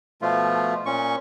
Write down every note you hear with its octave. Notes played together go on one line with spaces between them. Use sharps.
B2 F3 A3 F4
A#2 C#4 C#6